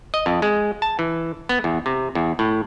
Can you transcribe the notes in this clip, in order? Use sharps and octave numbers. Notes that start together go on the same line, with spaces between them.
D#5
F2
G#3
A5
E3
B3
E2
C3
E2
A2